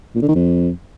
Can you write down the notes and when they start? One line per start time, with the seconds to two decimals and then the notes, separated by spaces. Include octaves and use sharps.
0.15 A#2
0.22 D3
0.28 D#3
0.35 F2